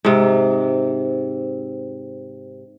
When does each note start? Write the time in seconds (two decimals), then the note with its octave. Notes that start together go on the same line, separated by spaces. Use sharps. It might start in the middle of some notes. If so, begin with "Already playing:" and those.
0.05 G#2 C3